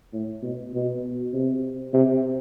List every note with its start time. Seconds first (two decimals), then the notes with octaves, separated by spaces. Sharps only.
0.13 A2
0.43 B2
0.73 B2
1.33 C3
1.93 C3